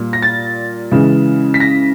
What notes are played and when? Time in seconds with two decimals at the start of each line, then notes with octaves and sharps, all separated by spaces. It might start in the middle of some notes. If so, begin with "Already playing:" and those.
Already playing: A#2 G3
0.13 A#6
0.22 A6
0.92 C#3 E3 G#3
1.54 B6
1.60 A#6